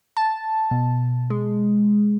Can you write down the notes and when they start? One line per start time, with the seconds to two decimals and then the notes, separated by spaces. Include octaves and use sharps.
0.17 A5
0.71 B2
1.30 G#3